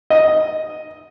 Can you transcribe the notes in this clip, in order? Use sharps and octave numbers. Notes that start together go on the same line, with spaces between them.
D#5